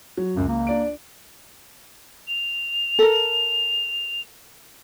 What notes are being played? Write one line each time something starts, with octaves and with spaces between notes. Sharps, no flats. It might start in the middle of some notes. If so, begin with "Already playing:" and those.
F#3
C#2 F#2
A#3
D4 D5 D7
F7
A4 A#4